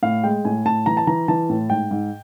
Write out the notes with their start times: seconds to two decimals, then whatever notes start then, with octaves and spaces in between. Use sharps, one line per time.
0.03 A2 F5
0.24 G#3 G5
0.45 A2 G#5
0.65 A2 A5
0.86 E3 A#5
0.97 A5
1.07 E3 A#5
1.28 E3 A5
1.50 A2
1.70 G#2 G5
1.91 G#2